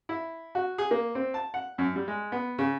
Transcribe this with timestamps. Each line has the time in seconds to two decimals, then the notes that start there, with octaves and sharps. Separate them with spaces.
0.09 E4
0.55 F#4
0.78 G#4
0.91 A#3
1.15 C4
1.34 A5
1.54 F#5
1.78 F#2
1.96 G3
2.08 G#3
2.32 B3
2.58 C#3